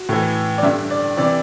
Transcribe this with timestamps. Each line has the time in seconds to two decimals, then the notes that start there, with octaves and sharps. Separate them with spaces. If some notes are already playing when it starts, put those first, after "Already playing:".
Already playing: F#4
0.09 A2 E3
0.58 D5
0.63 G2 D3 E5
0.91 D5
1.17 C3 E3 D5